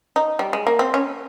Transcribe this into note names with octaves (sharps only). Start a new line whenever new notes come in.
D#4
G3
G#3
A#3
C4
C#4